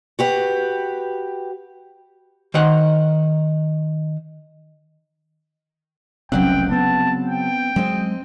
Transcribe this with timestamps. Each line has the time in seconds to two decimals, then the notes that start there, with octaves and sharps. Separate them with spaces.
0.19 F#4 G4 B4
2.54 D#3 C5 F#5
6.32 F1 C2 C#3 F#3 C4 F#5 G5
6.71 B3 C4 A5
7.27 G5
7.76 F#3 G#3 C4 D#5